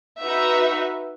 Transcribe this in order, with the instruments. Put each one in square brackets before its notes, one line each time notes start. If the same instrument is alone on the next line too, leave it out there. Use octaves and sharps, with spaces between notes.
[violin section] D#4 F#4 B4 E5